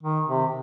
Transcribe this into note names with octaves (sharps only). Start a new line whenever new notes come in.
D#3
C3